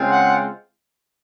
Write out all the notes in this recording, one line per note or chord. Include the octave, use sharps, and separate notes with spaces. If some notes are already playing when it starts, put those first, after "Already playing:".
Already playing: C#3 G#3 C4 F4
F#5